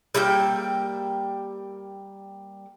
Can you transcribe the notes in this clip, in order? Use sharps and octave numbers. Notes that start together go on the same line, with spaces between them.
G3 A#3 E5 G5